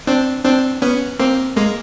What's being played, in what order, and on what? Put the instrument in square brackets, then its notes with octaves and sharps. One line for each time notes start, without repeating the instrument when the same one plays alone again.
[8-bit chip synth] C4 D4
C4 D4
B3 C#4
A#3 C4
G#3 A#3